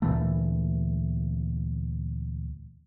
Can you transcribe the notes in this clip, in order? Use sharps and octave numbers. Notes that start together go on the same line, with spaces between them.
D2 A#2 E3 A3